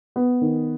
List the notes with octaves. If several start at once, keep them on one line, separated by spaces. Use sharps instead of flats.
B3
D#3